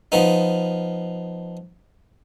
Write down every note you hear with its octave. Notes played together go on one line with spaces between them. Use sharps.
F3 B3 D#4